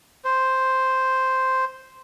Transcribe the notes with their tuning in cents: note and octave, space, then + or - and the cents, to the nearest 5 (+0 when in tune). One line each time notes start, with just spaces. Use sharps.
C5 +0